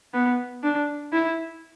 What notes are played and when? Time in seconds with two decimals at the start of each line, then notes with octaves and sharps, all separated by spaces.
0.14 B3
0.63 D4
1.13 E4